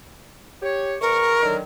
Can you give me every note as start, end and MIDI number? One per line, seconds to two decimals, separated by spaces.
0.62 0.95 67
0.62 0.95 73
1.01 1.40 40
1.01 1.55 70
1.01 1.40 85
1.43 1.61 50
1.43 1.61 51
1.43 1.61 54